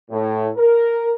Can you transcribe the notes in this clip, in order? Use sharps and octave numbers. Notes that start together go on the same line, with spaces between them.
A2
A#4